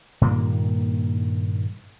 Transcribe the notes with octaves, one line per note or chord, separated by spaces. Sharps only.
G2 A#2 D#3 A#3